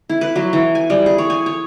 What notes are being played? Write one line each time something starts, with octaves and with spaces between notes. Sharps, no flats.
E4
B4
F#3
E3
G#5
G3
G#4
C#5
G#5
C#5